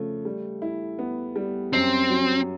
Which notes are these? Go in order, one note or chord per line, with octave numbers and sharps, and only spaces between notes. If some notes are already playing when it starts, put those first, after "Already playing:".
Already playing: C#3 F3 A3
G3
E4
B3
G3
F#2 C4
F#3